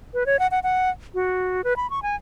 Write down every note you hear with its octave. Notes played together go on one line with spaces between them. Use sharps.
B4
C#5
F#5
F#5
F#5
F#4
B4
B5
C#6
G#5